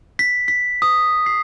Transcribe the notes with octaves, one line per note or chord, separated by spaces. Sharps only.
B6
B6
D#6
C7